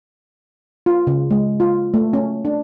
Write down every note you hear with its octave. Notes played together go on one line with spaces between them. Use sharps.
F4
C#3
G#3
F4
A3
C#4
D4